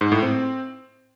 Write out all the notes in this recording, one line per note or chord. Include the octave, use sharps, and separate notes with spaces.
G#2
A2
C4